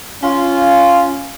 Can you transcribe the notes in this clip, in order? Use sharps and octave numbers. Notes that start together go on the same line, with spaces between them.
C#4 F4